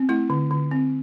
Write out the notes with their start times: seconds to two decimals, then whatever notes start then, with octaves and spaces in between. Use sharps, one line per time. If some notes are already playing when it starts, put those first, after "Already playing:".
Already playing: C4
0.09 A3 E4
0.30 D3
0.51 D3
0.71 C4